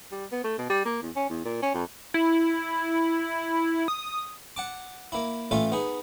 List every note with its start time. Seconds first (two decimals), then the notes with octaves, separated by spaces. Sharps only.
0.12 G3
0.32 B3
0.44 A3
0.58 B2
0.70 G3
0.85 A#3
1.02 E2
1.16 C#4
1.30 E2
1.45 A#2
1.62 C#4
1.74 F2
2.14 E4
3.88 D#6
4.56 F#5 A5 D6
5.12 A#3 E4
5.51 A1 A3 F4 A4 G#5
5.72 B3 D#4 G#4